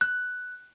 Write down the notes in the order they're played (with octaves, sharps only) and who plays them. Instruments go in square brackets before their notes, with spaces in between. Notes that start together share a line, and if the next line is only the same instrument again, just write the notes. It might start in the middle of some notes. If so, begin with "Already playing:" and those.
[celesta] F#6